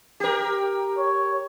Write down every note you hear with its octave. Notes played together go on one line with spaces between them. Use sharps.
G4 A#4
C#5